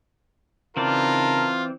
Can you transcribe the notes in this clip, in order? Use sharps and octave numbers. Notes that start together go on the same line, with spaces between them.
C#3 E3 C4 D#4 F4 A#4 D5 A5